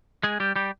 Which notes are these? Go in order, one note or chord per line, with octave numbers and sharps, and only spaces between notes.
G#3 G#4
G3 G4
G3 G4